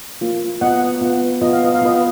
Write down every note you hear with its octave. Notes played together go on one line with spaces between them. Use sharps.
A#3 F4
B3 F4 D#5 F#5
B3 F4
B3 F4 D#5
F5
D#5
F5
B3 F4 B4 D#5